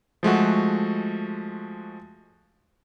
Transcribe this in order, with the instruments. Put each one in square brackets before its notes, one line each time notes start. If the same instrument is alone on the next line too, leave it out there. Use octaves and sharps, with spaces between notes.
[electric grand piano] F3 G#3 A3 F#4